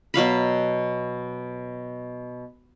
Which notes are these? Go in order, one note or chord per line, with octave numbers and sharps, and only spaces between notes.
B2 F#3 F5 B5